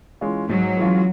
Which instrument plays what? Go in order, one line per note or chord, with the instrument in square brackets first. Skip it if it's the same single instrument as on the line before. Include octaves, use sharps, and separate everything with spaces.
[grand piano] E3 G#3 C#4 F4
[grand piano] G#2 [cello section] F#3
[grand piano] E3 G#3 C#4 F4